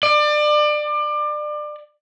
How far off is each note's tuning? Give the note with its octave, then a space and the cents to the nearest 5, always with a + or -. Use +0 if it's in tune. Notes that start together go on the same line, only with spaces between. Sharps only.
D5 +30